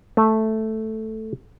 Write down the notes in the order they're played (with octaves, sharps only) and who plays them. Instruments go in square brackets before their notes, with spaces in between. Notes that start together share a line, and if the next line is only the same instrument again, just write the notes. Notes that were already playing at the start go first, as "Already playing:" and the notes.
[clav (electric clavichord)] A3